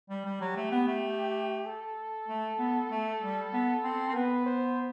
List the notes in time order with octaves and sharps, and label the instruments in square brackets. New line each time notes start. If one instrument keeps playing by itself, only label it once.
[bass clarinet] G3
G3
[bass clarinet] F#3 [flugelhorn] G4
[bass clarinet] A3
B3
A3
[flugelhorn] A4
[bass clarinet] A3
B3
A3
G3
B3
C4
C4
[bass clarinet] B3 [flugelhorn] B4
[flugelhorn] C5